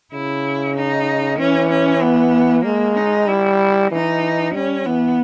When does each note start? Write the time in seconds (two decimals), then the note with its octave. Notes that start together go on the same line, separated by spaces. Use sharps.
0.13 C#3 E4
0.76 D#4
1.39 E3 C#4
1.71 C#4
2.02 B3
2.65 G#3 A#3
2.97 D#4
3.28 G3 E4
3.91 E3 D#4
4.54 G3 C#4
4.86 E3 B3